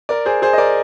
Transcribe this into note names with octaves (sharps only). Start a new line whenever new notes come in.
A#4 D5
G#4 C5
G#4 C5
D#5
A#4 D5